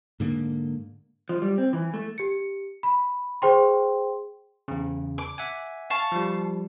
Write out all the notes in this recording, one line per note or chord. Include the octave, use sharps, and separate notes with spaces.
G#2 D3 A#3
F3
G3
C4
E3
A3
G4 C#7
B5
G#4 C5 G5 C6
E2 C#3
D6
E5 F#5 G#5
F5 A5 C#6
F3 G3